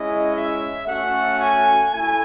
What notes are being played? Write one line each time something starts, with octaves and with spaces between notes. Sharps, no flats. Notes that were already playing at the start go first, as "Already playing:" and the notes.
Already playing: G#3 C#4 E4 D#5
E5
A3 C#4 F#4 F#5
G#5
A3 E4 G#5